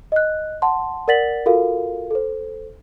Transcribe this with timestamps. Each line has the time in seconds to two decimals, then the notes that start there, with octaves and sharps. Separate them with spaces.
0.12 D#5 F#6
0.62 F#5 A5 C6
1.08 A#4 D5 F#5 A6 B6 F#7
1.46 F4 F#4 A4 A#4 F5
2.11 A4 C5